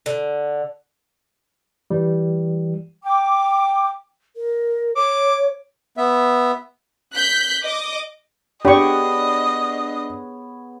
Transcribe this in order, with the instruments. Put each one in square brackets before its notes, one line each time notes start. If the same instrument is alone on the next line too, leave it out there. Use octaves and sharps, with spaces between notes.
[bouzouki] D3
[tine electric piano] E3 G3
[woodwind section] G5 D6
[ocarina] A#4
[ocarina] C#5 [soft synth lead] D6
[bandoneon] B3 E5
[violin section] F#6 G6 B6
D#5 D6
[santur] B3 G#4 C#5 [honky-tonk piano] D4 [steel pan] G4 C#6 [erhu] D#5